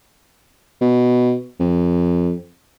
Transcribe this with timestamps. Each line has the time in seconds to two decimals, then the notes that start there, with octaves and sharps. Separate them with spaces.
0.81 B2
1.60 F2